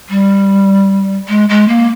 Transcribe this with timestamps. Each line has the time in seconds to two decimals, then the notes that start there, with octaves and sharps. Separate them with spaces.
0.10 G3
1.29 G#3
1.49 G#3
1.68 A#3